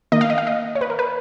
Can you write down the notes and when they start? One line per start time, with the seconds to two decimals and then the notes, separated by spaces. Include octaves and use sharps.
0.12 D#3 A#3 D#5
0.21 F5
0.30 D#5
0.38 F5
0.47 D#5
0.75 C#5
0.81 B4
0.90 A#4
0.99 B4